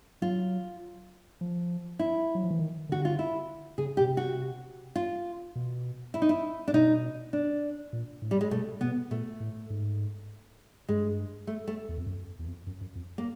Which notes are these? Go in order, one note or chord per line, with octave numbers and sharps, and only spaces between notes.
F#3 F4
F3
E4
F#3
F3
E3
D#3
D3 F#4
F4
E4
C#3 G#4
G4
B2
C3
F#4
F4
B2
E4
D#4
E4
D4
B2 D#4
D4
A#2
A2
G3
G#3
B2 A3
B2 B3
A#2 A3
A2
G#2
G2 G#3
A3
A3
E2
F2
F#2
E2
F2
F#2
F#2
F2
A#3